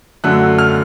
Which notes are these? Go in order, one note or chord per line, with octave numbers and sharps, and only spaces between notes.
F#2 D3 F#3 A3 F#6
F6